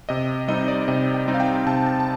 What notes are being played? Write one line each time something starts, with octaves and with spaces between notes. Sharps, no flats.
C3 D#5
G3 C4 D#4 D#5
D5
C3 D#5
G5
G3 C4 D#4
F5
G5
C3 A5
A5
A5